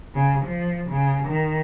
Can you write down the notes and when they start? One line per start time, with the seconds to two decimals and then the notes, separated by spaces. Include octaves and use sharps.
0.15 C#3
0.46 F3
0.91 C#3
1.27 D#3